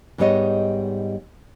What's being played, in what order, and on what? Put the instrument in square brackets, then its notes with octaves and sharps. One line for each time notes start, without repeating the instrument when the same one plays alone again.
[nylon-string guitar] G#2 G3 B3 D#4 C#5 D#5